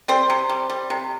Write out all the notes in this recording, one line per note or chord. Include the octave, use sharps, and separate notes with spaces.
G3 C4 C5
C3
G3
G3
C3